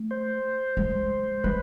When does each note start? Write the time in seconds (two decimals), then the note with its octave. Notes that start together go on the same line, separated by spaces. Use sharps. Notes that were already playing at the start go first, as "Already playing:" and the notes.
Already playing: A3
0.11 C5
0.77 G#3
1.44 G#3 B4